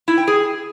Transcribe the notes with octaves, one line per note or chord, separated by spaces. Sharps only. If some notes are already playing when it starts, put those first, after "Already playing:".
E4
G5
G#4